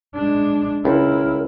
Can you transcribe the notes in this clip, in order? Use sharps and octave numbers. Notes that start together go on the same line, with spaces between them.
G#3 D4
C#2 E4 A#4